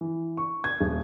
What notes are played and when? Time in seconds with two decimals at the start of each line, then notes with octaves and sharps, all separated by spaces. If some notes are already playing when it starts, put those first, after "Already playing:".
0.01 E3
0.37 C#6
0.64 G#6
0.80 D#1